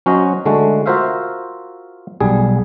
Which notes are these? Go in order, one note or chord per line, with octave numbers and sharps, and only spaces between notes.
F#3 C#4 F#4 C5 D#5
D3 G#3 A3 F#4
F4 F#4 A#4 C5 E5 F5
B1 G3 G#4